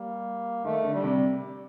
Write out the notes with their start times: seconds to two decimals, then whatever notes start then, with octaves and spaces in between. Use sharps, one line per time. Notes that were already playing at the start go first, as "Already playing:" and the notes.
Already playing: G3 A#3
0.64 D#3 A3
0.84 D3
0.94 G3
1.03 C3